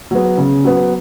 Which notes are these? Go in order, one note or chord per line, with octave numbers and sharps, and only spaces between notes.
F#3 B3
C#3
F#3 B3